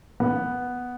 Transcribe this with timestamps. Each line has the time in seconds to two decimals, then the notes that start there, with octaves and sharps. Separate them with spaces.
0.20 B3